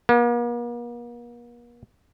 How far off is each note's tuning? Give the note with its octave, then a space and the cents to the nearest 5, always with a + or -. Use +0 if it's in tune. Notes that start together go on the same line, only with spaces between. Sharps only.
A#3 +45